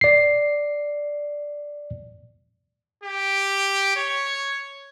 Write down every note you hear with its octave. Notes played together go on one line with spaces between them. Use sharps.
D5 C7
G4
C#5